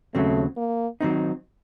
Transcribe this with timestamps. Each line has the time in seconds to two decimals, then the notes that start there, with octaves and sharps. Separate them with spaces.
0.14 D#2 C#3 F#3 A3 C4
0.57 A#3
1.01 D#3 F#3 C4 D#4